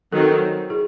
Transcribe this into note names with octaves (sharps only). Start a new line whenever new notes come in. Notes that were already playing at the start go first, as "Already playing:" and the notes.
D#3 F#3 C4 F#4 A4
E4 G#4